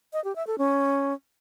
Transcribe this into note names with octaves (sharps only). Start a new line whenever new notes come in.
D#5
G4
E5
A4
C#4